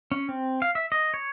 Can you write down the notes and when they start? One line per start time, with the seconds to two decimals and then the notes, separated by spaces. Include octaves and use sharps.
0.12 C#4
0.29 C4
0.62 F5
0.75 E5
0.92 D#5
1.14 C#5